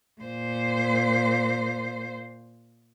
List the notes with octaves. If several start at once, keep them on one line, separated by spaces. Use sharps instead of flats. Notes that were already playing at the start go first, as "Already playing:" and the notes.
A#2 C5